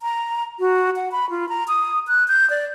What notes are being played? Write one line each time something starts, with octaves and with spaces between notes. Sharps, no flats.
A#5
F#4
F#5
B5
F4
A#5
D#6
F#6
G6
D5